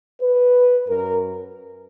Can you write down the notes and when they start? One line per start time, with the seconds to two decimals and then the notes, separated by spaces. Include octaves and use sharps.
0.21 B4
0.88 F#2 A#4